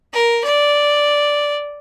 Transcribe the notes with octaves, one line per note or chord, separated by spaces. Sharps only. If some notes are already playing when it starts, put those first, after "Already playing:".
A#4
D5